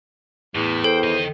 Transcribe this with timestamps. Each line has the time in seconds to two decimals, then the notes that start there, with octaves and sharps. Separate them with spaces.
0.55 E2 A2
0.84 A4 C5 G5
1.04 D#3 D#5